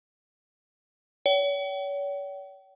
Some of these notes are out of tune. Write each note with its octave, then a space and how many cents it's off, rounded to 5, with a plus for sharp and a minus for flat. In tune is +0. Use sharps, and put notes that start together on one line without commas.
C#5 +40 G5 -40